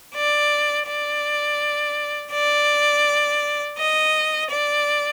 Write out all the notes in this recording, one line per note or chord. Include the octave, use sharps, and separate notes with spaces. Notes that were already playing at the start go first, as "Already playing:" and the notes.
D5
D5
D5
D#5
D5